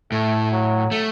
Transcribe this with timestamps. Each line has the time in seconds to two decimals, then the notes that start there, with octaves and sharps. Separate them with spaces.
0.12 A2 A3
0.52 F#3
0.91 A3